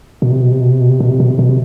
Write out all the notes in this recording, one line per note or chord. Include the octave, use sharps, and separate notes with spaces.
B2
C3
B2
C3
B2
C3
B2
C3
B2
C3
B2
C3
B2
C3